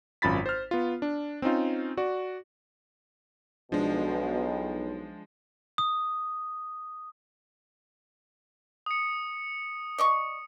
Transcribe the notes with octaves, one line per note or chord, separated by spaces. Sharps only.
G#1 F#2 F4 B5 A6 B6
C5 F6
B3 F4
D4
C4 C#4 D#4 F4
F#4 D5
B1 B2 F3 G#3 D4
D#6
D#6 C#7
D5 D#5 C#6